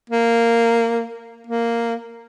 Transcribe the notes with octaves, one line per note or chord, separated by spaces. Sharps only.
A#3
A#3